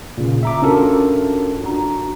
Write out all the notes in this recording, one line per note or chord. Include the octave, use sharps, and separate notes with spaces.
A#2 C#3
E5 A#5 D6
C#4 D4 F4 F#4 A4 A#4
D4 F#4 A#5